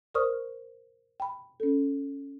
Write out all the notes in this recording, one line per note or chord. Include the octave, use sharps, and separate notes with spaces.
A#4 C5 D5 C#6 D#6 F6
G5 B5
C#4 A4